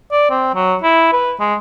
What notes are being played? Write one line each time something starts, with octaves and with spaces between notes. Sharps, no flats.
D5
C4
F#3
E4
B4
G#3